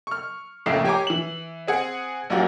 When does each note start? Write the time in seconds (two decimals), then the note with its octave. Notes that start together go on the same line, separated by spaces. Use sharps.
0.07 C#6 F6
0.66 F2 A2 C#3 A3 A#3 C7
0.85 G4 C#5 G5 G#5 A#5 D6
1.07 E3 F#7
1.68 C4 G#4 F#5
2.30 A#1 F#2 A#3 F#4 G4